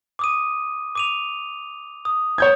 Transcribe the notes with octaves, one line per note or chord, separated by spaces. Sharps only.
D6 D#6 D#7
D6 D#7 F7
D#6
C#5 G6 G#6